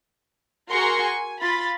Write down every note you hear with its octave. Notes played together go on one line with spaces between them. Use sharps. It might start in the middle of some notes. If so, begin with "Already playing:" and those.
F#4 G#4 A#4 A#5 C6 C#6
G#5
F4 B5 A6